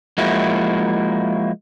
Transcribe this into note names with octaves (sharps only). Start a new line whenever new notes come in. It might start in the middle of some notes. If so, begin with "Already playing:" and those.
F3 G#3 A#3 E4 F#4